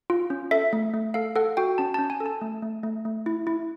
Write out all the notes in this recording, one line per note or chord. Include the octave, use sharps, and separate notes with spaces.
F4
C#4
A4 E5
A3
A3
A4 F5
A4 F#5
F#4 G5
C#4 A5
C#4 A5
G#5
A4
A5
A3
A3
A3
A3
E4
E4